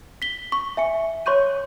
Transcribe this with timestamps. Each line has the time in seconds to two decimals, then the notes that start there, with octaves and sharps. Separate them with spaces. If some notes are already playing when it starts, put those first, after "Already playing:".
0.22 B6 G7
0.52 C#6
0.77 E5 G#5 C#7
1.26 C#5 C6 C#6 G6 D#7